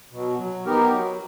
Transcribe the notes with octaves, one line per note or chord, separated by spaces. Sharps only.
B2 F#3
F#3
B3 D#4 G4 A#4
F#3